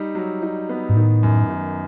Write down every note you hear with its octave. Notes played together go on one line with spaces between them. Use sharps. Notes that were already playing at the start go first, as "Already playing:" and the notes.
Already playing: G3 D#4
F#3
D#4
B3
G#2
A2 D#3
F#2
D#3